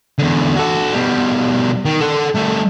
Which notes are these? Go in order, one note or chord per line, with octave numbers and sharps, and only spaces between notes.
E2 D3
F#4 A4
B2 G3
D#3
A4 F#5
G3 A3